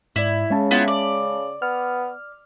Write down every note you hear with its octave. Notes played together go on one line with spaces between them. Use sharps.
G#2 E4 D5
C#3 G#3 C#4 A5
B3 E4 F4
D5
B3 F6